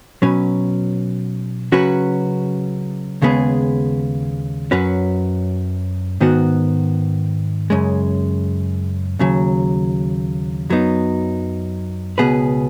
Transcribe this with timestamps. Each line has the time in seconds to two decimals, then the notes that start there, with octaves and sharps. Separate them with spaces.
0.22 B2 F#3 C#4 B4
1.72 C#3 F#3 C#4 F#4 B4
3.22 D#2 C#3 G#3 B3 G#4
4.71 F#2 F#3 C#4 F#4 B4
6.21 G#2 D#3 B3 F#4
7.70 F#2 C#3 G#3
9.19 D#2 C#3 F#3
10.70 F#2 F#3 B3 D#4
12.18 C#2 B2 B3 G#4 B4